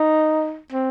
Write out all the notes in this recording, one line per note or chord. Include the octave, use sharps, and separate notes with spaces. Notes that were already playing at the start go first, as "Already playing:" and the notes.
Already playing: D#4
C4